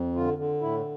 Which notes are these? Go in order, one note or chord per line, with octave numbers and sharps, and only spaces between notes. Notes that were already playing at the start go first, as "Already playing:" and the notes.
Already playing: F2
D3 F4
D3
A2 E4